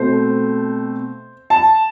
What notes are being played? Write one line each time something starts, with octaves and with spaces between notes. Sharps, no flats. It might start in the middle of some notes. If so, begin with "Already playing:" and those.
Already playing: B2 A3 C4 C5
A5